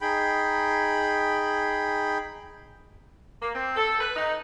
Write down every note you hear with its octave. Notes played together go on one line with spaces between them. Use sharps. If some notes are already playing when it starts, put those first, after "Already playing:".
D#4 G#4 G5 B5
A#3
C4
A4
B4
D#4